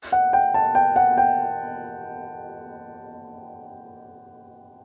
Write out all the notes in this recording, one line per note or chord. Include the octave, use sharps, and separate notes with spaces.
F#5
G5
A5
G5
F#5
G5